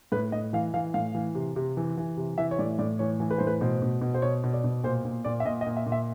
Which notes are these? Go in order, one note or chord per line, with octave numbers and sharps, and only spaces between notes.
A2 B4
A2 D#5
E3 F5
E3 F5
A2 F5
E3
C3
C3
E3
E3
C3
E3 E5
C#5
A2 D5
A2 D5
E3 C#5
E3
B4
A2 C5
B4
B2 C5
B2
B2
C5
B2 C#5
B2
D5
B2
A#2 C5
A#2
A#2 D5
E5
A#2 D#5
D#5
A#2
E5
A#2
E5